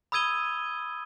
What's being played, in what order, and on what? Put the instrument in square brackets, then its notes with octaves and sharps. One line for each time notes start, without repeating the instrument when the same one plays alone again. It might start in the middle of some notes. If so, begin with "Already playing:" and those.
[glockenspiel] B5 D#6 E6 G#6 D#7 G7